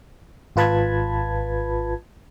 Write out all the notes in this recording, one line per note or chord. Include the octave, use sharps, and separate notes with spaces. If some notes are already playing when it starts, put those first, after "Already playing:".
G#1 F4 B4 A5 B5 G#6